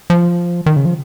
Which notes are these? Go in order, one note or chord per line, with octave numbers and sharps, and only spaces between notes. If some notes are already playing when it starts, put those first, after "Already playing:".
F3
D#3
C#3
F3